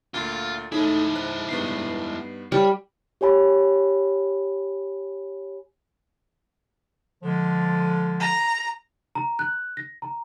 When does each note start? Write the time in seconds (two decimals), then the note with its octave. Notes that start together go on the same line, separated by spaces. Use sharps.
0.14 D2 A#2 F4
0.72 G#3 A3 D#4 E4 G#4
1.15 C5 F#6
1.49 G2 B3 D#4 C7
2.52 G3 C#5 F6
3.21 G4 C#5 G#5 B5
7.23 D3 F3 G#3
8.20 A#5
9.15 A#5
9.39 F#6
9.77 A#6
10.02 A#5